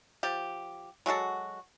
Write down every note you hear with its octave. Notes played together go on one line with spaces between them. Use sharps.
F3 G4
F#3 G#3 F#4 A4